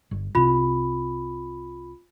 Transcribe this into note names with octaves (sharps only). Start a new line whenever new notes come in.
G1
C2 C3 F4 B5